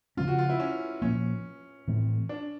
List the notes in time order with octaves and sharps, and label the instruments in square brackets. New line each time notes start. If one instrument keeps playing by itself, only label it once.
[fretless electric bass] C#3 F3 A3 C#4 [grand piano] F4
[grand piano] F#4
F4
E4
C#4
[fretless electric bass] A#2 F3 A#3 [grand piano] C#4
[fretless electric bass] A2 E3 A3 C4
[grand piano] D4